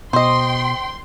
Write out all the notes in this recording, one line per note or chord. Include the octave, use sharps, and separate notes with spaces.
B2 C5 D#5 G5 C6